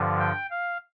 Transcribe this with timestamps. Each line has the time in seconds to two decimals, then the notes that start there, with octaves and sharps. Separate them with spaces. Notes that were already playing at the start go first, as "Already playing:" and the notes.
Already playing: G2 D3 F3
0.19 G5
0.50 F5